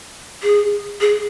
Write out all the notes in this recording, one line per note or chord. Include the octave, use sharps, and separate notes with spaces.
G#4
G#4